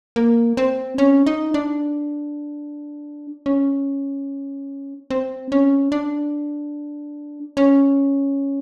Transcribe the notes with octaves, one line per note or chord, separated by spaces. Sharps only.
A#3
C4
C#4
D#4
D4
C#4
C4
C#4
D4
C#4